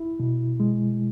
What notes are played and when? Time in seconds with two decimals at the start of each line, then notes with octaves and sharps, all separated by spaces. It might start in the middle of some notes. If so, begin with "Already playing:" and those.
Already playing: E4
0.20 B2
0.60 G#3